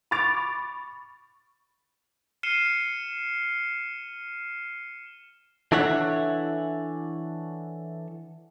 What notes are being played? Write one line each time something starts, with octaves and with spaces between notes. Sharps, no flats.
B5 C#6 D6 A6 D7 F7
F6 C7 C#7 D#7 E7 G7
E3 D4 A4 C#5 E5 F#5